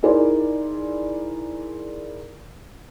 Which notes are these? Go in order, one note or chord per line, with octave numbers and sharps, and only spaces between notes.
D#4 E4 G#4 A#4 C5 D5